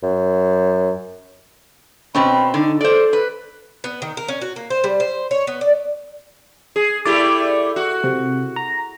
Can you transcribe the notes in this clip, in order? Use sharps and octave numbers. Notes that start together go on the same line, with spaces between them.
F#2
B2 C4 C#4 B5
D3 D#4
A4 C5 D5
B4
B3
D#3
A#4
C#4
F#4
A#3
C5
G3
C5
C#5
B3
D5
G#4
A3 E4 G4 D5
F#4
C3
A#5